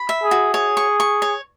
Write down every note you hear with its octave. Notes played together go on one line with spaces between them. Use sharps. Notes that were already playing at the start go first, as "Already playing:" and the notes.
Already playing: B5
E5
G#4
F#4
G#4 C#5
C#6
C#6
C#5